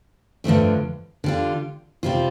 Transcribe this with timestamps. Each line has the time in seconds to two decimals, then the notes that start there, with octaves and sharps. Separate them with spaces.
0.44 G2 D3 F3 A3 D4
1.24 D3 G3 F4
2.03 C3 G3 C4 F4